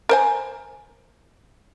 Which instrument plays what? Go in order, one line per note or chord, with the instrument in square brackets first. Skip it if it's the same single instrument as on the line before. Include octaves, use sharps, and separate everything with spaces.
[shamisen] A#4 C5 G#5